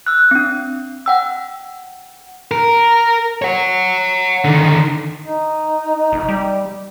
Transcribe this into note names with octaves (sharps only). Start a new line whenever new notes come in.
E6 F#6
C4 D4
F#5 G5 E6
A#4
C#5 F#5
D3 D#3
D#4
F1
G3